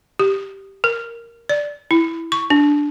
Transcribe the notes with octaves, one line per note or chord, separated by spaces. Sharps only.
G4
A#4
D5
E4
C#6
D4